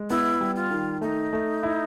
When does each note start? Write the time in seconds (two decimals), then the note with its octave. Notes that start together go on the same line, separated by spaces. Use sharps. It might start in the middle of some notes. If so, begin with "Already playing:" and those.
Already playing: G#3
0.10 B3 E4
0.41 G3
0.56 F4
0.71 D#3
1.01 A3 D#4
1.33 A3
1.63 E4